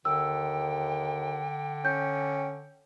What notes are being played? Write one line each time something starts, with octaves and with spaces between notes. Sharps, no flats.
D#2 D3 G5 E6
C#4 G6